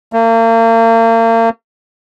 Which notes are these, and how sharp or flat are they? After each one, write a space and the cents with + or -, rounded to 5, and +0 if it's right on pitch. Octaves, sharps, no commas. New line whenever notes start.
A#3 -40